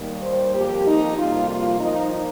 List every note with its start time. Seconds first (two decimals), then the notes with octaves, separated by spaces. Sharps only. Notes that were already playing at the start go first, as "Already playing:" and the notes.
Already playing: D#2 D#3 G3 A#3
0.22 C5
0.53 F2 F3 A#3 G4
0.85 D#4
1.16 F2 C3 G3 A#3 F4
1.48 F4
1.79 A#2 F3 A#3 D#4